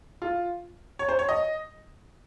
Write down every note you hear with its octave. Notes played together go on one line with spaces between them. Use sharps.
F4
C#5
C5
C#5
D#5